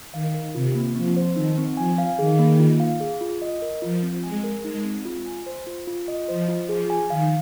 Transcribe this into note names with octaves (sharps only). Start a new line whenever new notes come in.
D#3 F5
A#4
C3 F4
A#3
F3 C4
C5
D#3 D#4
C4
F3 G#5
F5
D#3 G#4
A#3
F4
F5
G#4
F4
D#5
A#4
F3 F4
C4
G#3 G#5
A#4
G#3 D#4
C4
F4
G#5
C5
F4
F4
D#5
F3 C5
F4
F3 G#4
G#5
D#3 F5